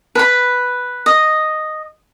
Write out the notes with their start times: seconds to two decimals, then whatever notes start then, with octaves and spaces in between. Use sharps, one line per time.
0.15 B4 B5
1.06 D#5